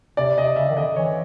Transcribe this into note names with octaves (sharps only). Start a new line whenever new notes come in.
C3 D5
C3 D#5
C#3 E5
D#3
D3 D#5
E3 C#5